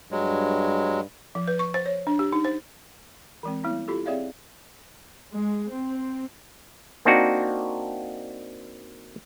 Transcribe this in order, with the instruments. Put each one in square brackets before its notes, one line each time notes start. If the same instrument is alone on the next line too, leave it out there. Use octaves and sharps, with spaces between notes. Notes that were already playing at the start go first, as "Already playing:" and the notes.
[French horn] G2 [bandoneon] F#3 G#3
[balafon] F3
B4
C#6
C5
C#5
D4
G4
D#4
C5
E3 G#3 C4
G3 A#3 B3 E4
E4 F4 G4 A4
C4 G#4 C#5 D5 E5 F5
[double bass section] G#3
C4
[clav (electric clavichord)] A#3 C4 D4 D#4 F#4